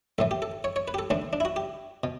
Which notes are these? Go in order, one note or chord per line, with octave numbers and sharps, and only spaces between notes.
A1 A2 E3 A4
G4
A4
C#5
C#5
B4
G4
A4
A1 A2 E3 D4
D4
E4
F#4
G4
B2